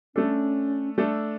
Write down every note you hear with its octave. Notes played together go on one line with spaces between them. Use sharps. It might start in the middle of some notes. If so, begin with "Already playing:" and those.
A3 C#4 D4 A4
A3 D4 A4